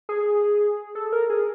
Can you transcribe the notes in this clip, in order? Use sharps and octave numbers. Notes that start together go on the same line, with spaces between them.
G#4
A4
A#4
G#4